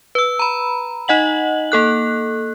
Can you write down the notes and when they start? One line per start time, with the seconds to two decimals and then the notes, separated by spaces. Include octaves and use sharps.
0.15 B4 E6
0.39 A#5 B5
1.08 D#4 D#5 F#5 F#7
1.72 A#3 A4 F#6